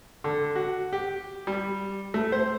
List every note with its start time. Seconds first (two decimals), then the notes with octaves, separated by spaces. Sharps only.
0.24 D3
0.56 F#4
0.93 G4
1.47 G3
2.14 A3
2.32 C5